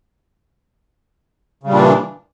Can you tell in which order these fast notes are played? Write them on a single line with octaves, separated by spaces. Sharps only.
C#3 G3 A#2 D4 E3